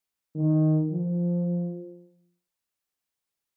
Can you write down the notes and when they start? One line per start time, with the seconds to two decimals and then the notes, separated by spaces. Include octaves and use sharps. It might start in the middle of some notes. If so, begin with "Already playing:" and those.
0.35 D#3
0.91 F3